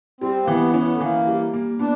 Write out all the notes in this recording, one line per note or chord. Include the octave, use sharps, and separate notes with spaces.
G3 C4
A#3
E3 B3
B3 C#4
A3
E3 A#3
G3
A#3
B3 D4